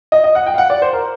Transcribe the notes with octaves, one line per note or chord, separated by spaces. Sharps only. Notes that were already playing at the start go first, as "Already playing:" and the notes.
D#5
D#5
F#5
G5
F5
F#5
D5
C5
A#4